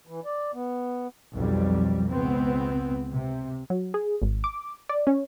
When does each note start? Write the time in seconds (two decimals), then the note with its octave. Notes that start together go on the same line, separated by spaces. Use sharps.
0.07 E3
0.25 D5
0.54 B3
1.35 B1 F2 G3
2.09 C#2 B3 C4
3.12 C3
3.70 F#3
3.94 G#4
4.22 G#1
4.44 D6
4.89 D5
5.07 C#4